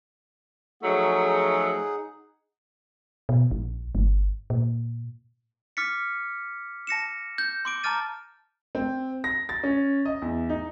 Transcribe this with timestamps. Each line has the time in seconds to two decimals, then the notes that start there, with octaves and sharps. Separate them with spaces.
0.83 F3 F#3 A3 D#4 G#4 F#5
3.29 B2
3.51 A#1
3.95 G1
4.50 A#2
5.77 D6 F6 A6 B6 C#7
6.87 A5 A#6 C#7 E7
7.38 G6
7.65 C6 D6 D7
7.83 A5 A#5 D6 F6 A6 D#7
8.75 C4
9.24 A#6
9.49 A6
9.63 C#4
10.05 D#5
10.22 E2
10.49 D#4